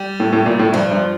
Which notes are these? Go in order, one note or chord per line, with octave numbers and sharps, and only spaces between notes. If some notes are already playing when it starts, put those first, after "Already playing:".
Already playing: G3
A2
A2
A#2
A2
G2 F3
G2